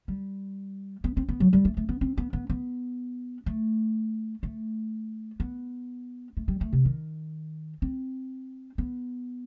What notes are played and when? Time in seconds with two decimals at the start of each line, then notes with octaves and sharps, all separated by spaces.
0.08 G3
1.04 B3
1.17 C4
1.29 B3
1.40 F#3
1.53 G3
1.65 A3
1.77 A3
1.89 B3
2.01 C4
2.18 B3
2.33 B3
2.50 B3
3.46 A3
4.43 A3
5.40 B3
6.37 A3
6.48 G3
6.61 A3
6.73 C3
6.85 D#3
7.82 C4
8.78 B3